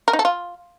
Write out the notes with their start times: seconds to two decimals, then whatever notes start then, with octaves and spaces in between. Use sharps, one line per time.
0.08 A#4
0.13 D#4
0.19 A4
0.25 F4